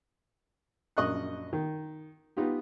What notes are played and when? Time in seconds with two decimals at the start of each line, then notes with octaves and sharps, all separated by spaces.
0.97 A#1 F#2 D#5 C#6 F#6
1.53 D#3
2.37 B3 D#4 F4 G4